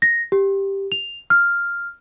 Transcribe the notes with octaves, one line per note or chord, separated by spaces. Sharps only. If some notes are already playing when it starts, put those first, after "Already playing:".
A#6
G4
F7
F6